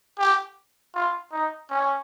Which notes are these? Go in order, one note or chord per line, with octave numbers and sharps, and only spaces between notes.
G4
F4
D#4
C#4